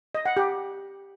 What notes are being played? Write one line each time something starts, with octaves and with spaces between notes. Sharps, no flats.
D#5
F#5
G4